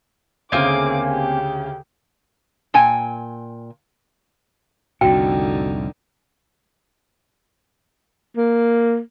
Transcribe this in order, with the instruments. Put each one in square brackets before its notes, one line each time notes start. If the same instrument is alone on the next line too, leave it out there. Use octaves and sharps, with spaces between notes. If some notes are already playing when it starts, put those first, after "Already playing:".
[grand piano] D2 C#3 [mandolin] A#3 C4 G#5 [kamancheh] G#4 D6
[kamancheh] G4
[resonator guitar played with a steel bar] A#2 G5 G#5
[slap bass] C2 F2 A2 [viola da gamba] D3 D#4 [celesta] F#4 [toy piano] G5
[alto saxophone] A#3